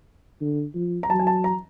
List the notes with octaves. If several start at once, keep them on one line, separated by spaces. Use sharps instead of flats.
D3
F3
A#5
F#3 A5
G#5
A5
A#5